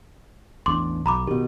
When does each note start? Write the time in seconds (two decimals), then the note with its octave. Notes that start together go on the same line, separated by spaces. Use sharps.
0.66 A1 E2 D4 C6 D6
1.06 B1 A#5 B5 D6
1.27 B2 D#3 G4